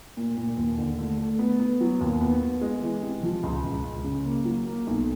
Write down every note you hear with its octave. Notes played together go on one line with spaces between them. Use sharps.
A#2
A#2
D#2
D3
A3
A3
B3
B3
F#3
D#2
B3
B3
G#3
E3
C3
F3
C#2
C#2
C#2
C#3
A#3
F#3
A#3
B1